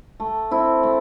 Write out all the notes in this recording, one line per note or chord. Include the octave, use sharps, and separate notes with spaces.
A3
C4 E4
A3